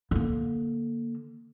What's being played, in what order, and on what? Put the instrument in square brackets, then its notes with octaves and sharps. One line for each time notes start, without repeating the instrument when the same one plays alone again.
[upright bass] D3 A#3